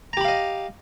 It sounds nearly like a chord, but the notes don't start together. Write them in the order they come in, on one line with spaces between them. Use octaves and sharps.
A#5 G4 B5 F5 D#5